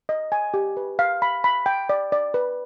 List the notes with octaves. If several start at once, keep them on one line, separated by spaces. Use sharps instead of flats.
D#5
G#5
G4
B4
F5
B5
B5
G5
D5
D5
B4